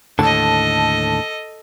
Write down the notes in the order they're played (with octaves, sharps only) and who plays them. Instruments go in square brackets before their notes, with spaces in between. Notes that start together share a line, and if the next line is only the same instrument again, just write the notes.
[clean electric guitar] D#2 A2 D3 [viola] A4 D#5 [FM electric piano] A5